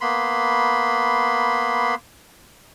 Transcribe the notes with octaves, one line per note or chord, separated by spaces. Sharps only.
A#3 B3 B5 C6